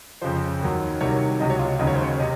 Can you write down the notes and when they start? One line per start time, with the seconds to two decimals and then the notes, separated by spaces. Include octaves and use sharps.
0.21 F2 C#3 F3 C5
0.61 D#2 D#3 F#3
1.01 C2 C3 D#3 F#3 C#5
1.40 C#2 C3 F#3 D#5
1.50 C#5
1.59 F4
1.79 D#2 C#3 F#3 D#5
1.87 C#5
1.95 C5
2.03 C#5
2.19 C3 D#5